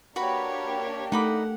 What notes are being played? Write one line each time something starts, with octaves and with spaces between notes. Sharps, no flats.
A#3 D4 F#4 G4 A#4 B4 C#5 B5
A3 D#4 F#5 B5 D6